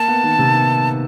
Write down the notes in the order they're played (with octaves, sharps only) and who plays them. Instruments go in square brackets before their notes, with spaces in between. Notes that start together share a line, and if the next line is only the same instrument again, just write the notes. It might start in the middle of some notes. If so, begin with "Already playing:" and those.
Already playing: [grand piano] A#3 [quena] A5
[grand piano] B3
D#3
C3
B3